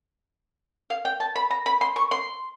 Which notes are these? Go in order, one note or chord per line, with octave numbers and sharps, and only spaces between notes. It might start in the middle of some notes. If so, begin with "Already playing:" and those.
F5
G5
A5
B5
A#5
B5
C6
C#6
C6